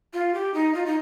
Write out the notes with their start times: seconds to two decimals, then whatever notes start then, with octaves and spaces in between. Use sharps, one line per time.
0.13 F4
0.34 G4
0.54 D#4
0.75 F4
0.86 D#4